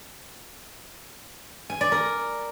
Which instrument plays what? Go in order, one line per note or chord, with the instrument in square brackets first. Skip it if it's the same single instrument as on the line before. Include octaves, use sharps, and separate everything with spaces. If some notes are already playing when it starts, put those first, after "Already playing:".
[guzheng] G#5
D5
A#4